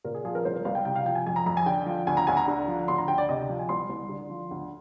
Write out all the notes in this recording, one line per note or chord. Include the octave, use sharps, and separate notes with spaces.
A#2 A#4
G#4
F3 G#4
A#4
C2 C5
A#4
C2 F5
G5
C3 G5
F5
F3 G5
G#5
F2 G#5
A#5
F2 A#5
G#5
D3 G5
F3
D2 G#5
A#5
D2 G#5
A#5
D3
F3
D2 C6
A#5
D2 G5
D5
C3 D#5
G5
F3
G#5
C2 C6
C2
D3
F3
D2